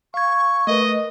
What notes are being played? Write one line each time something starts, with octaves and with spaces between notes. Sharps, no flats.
F5 C#6 G#6
A3 A#4 B4 D#5